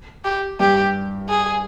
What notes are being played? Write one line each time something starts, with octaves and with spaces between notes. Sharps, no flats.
G4
G2 G3 G4
G#4